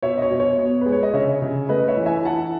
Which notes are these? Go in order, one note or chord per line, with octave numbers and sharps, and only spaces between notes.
B2 C#5 E5
D#5
C#5
B2
C#5
B3
G#3 B4
C#5
D#5
C#3 C#5 E5
C#3
A3 B4 D#5
C#5 E5
E3
E5 G#5
E4 F#5 A5